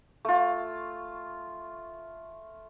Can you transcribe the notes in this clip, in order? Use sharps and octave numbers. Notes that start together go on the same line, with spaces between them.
A3 F4